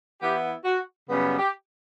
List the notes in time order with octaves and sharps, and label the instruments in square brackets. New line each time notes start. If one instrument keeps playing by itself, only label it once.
[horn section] E3 B3 E4 G4
F#4
F#2 C#3 G3 B3
G4